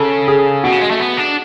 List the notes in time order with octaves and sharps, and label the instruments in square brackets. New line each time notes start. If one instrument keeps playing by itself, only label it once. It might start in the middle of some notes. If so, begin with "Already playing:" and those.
Already playing: [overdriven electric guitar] C#3 [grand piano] A4
[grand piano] G#4
[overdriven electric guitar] B2 [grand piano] F#4
[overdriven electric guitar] C#3
G#3
A3
B3
D4